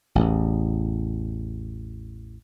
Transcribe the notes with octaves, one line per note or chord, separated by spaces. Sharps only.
A1 E2